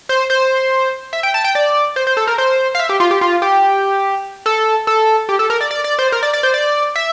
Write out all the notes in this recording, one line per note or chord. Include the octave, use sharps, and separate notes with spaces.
C5
C5
E5
G5
A5
G5
D5
C5
C5
A4
A#4
C5
F5
E5
G4
F4
G4
F4
G4
A4
A4
G4
A4
A#4
D5
D5
D5
C5
A#4
D5
D5
C5
D5
E5